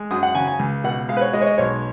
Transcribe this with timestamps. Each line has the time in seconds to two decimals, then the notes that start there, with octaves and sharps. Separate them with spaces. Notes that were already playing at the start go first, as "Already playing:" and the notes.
Already playing: G#3
0.11 F#2 D#6
0.23 F#5
0.35 C#3 G#5
0.47 G#5
0.59 C#2
0.84 B2 F#5
1.09 G#3 F5
1.17 B4
1.21 C#5
1.33 G#3 D#5
1.42 C#5
1.46 D#5
1.58 B1 C#5